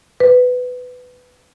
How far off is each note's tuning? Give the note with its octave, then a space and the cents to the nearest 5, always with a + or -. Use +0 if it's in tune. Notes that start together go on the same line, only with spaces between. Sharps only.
B4 +15